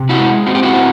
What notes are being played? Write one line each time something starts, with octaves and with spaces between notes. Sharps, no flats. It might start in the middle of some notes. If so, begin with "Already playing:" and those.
Already playing: C3
E4 F#4
G#3
C4 F#4
G4
E4 F#4
C4